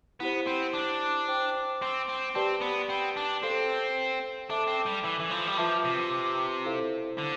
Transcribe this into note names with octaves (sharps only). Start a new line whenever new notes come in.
B3 E4 G4 C5
C4
D4
C5 G5 D6
C4
C4
C4 G4 B4 D5 A5 C6
B3
C4
D4
C4 A4 C5 F5
D4 A4 E5 A5 D6
C4
G3
E3
E3
F3
G3
F3 F4 B4 E5 A5 D6
C3
E4 A4 C5 F5
D3